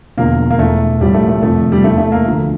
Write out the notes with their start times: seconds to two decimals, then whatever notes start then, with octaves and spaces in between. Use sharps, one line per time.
0.18 E1 E2 D3 F3 A#3
0.50 A#3
0.59 E1 E2 E3 A3
1.01 A1 A2 F3 G3
1.14 A3
1.29 A3
1.42 F1 F2 C3 F3 A3
1.72 G3
1.84 E2 E3 A3
1.98 A3
2.12 A#3
2.26 D2 D3 F3